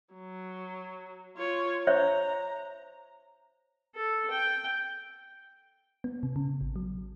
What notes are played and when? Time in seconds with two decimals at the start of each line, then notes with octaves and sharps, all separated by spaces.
0.14 F#3
1.37 F4 C#5
1.87 C5 C#5 E5 A#5
3.95 A4
4.31 G5
6.04 B3
6.23 C3
6.36 C#3
6.61 A1
6.76 F#3